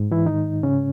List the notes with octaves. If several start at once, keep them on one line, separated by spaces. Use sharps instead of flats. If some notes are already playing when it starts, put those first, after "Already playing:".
Already playing: G#2
E3 E4
D#3 D#4
C#3 C#4